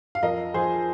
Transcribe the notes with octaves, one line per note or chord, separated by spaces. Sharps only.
F5
F2 A#4 D#5
F3 G#4 C5